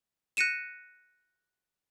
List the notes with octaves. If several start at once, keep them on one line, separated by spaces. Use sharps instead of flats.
F#6 A#6 C#7 D#7 E7